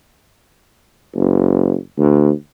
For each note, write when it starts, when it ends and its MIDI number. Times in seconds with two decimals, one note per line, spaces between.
1.16 1.75 30
1.98 2.30 38